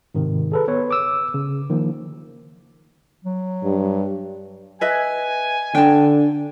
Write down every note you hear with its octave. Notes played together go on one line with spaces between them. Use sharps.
G#2 C3 D#3
G#4 A4 B4
B3 B4 C#5
D6 E6
C#3
D#3 F3 A#3
F#3
G2
B4 D#5 E5 G#5
D3 D4 G5 A5